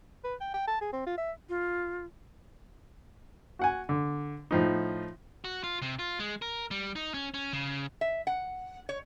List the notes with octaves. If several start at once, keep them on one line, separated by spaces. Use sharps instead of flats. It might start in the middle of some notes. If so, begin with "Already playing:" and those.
B4
G5
G5
A5
G#4
C4
F4
E5
F4
F#4 F#5 G#5
D3
A2 F3 D#4
F#4
F4
C3
F4
G#3
A#4
G3
D#4
C#4
C#4
C#3
E5
F#5
C#5